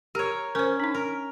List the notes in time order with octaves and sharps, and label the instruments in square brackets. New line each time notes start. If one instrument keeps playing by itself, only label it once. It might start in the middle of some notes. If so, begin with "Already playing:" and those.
[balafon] G4 [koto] A#4 C#5
[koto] C#4 [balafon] A#4 C5
[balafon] D4 D#4
[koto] A#4